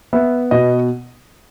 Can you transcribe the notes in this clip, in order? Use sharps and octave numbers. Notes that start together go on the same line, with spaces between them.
B3 E5
B2 D#5